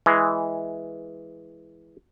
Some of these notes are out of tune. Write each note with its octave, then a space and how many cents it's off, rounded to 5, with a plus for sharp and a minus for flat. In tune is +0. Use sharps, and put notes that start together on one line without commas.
E3 +0 G#3 +0